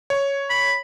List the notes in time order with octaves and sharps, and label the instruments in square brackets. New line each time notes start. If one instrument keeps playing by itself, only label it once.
[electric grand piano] C#5
[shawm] B5